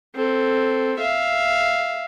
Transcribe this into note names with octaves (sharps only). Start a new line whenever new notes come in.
C4 A4
E5 F5